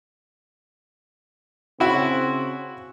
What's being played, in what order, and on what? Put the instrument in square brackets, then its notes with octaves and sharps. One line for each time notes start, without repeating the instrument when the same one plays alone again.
[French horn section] C#3 C4 [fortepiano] E4 F#4